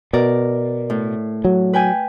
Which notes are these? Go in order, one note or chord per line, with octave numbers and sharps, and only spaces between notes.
B2 A#4 D5
A2
F#3
B4 G5 G#5